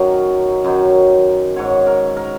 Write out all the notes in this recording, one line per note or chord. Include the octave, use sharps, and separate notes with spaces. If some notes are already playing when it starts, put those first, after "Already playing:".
Already playing: F#2 D#3 F#3 A#4
F#2 D#3 F#3
G#2 F#3 C#5
A#4
A#4